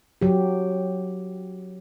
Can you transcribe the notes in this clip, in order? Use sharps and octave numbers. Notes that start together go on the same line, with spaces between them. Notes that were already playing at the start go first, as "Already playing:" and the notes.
F#3 G4